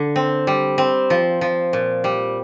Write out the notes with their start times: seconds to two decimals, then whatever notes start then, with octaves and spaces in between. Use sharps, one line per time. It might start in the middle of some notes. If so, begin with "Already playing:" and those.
Already playing: D3
0.16 C4
0.47 G3
0.78 C4
1.10 F3
1.41 F3
1.73 A#2
2.04 G3